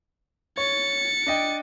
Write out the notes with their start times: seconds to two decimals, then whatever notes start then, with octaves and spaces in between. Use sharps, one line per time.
0.57 C#5 A6 C#7
1.27 D4 D#5 G5